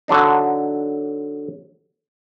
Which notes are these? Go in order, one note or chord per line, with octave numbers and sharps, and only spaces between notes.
D3 F#3 D4 D#4